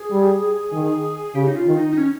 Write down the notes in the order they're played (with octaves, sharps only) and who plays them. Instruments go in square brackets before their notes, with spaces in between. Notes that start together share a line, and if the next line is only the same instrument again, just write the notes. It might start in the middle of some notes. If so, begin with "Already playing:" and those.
Already playing: [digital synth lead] G#4
[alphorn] G3
D#3
[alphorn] C#3 [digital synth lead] G4
[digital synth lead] D#4
F4
[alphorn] D#3
[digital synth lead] D#4
D#4
C#4